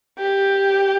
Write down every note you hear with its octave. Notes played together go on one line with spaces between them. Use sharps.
G4